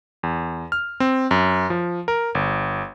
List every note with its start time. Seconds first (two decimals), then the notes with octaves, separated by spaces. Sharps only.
0.23 E2
0.72 F6
1.00 C4
1.31 F#2
1.70 F3
2.08 A#4
2.35 G1